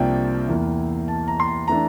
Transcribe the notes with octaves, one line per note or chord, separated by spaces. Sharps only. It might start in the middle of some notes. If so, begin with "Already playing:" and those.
Already playing: C2 C3 F3 A#3 D4 D5 E5 G5
E2 E3 A#3 E4
A5
A#5
C6
A#5
E3 A3 D4 A#5